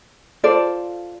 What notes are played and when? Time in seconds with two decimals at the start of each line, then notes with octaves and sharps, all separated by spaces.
0.43 F4 A4 C5 D5